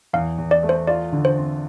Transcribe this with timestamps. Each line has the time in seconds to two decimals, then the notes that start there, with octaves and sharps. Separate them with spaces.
0.13 E2 F5
0.38 E2
0.51 D5
0.63 A3
0.69 C5
0.87 F4 D5
1.12 D3
1.25 C5
1.37 C4